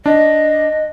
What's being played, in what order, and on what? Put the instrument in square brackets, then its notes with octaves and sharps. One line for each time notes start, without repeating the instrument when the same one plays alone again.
[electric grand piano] D4 [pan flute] D#5